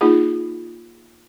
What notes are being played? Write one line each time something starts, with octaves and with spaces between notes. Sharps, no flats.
A#3 D#4 F4 G#4